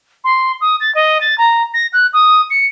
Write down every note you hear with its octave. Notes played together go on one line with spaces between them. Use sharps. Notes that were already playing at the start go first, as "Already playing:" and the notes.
C6
D#6
A6
D#5
A6
A#5
A#6
F#6
D#6
C#7